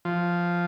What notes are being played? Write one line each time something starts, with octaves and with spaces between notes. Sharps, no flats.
F3